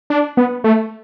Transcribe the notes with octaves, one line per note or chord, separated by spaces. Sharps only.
D4
B3
A3